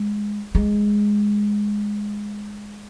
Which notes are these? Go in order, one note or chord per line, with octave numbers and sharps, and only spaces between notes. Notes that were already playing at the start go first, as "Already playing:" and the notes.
Already playing: G#3
G#3